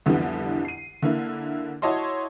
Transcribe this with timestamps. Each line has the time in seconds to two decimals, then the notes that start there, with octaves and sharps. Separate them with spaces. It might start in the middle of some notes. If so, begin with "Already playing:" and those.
0.06 C2 F2 D3 E3 G3 B3
0.65 C7 D#7
1.02 D3 A#3 E4
1.82 E4 F#4 C#5 D#5 A5 C6